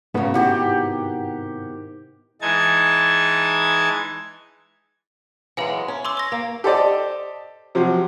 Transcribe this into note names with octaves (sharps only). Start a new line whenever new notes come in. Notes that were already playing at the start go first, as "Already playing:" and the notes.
G#2 C#3 F#3 A3 B3
C3 D#3 E4 F#4 G4 F#5
E3 G#3 D#4 A5 G#6
E3 F#3 G#3 B4 F5 G#5
C#4
C6 D6 E6
E6 A#6
A#3
G4 A4 C5 D5 D#5
C3 F3 F#3